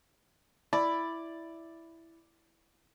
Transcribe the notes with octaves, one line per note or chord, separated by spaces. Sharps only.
E4 D5